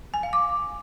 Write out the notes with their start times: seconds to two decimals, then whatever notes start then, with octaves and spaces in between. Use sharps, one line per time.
0.14 G#5
0.23 F5
0.33 D6